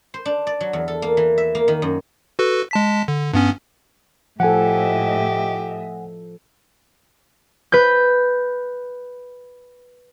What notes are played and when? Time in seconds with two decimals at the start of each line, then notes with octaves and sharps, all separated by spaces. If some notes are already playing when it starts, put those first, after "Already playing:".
0.14 C5
0.25 D4
0.47 D5
0.60 F#3
0.73 E2
0.88 A4
1.02 A#3
1.17 E3
1.38 E5
1.55 A#3
1.68 D#3
1.82 F#2
2.39 F#4 A4 B4
2.71 G#3 A5 B6
3.08 D3
3.33 G2 B3 C#4
4.40 A2 F3 G4 A4 D#5 E5 F#5 G#5
7.72 B4 G6